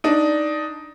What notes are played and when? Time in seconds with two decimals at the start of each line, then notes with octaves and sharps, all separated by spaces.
0.04 D4 D#4